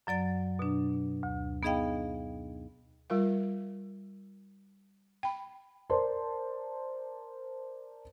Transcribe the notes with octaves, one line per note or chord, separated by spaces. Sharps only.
F#2 F#3 D5 A6
B2 D4
D2
B3 D#4 G#4 D#5 F5 G5
G3 F4 A#4 F5
G5 B5
A#4 C5 D5 A5 C6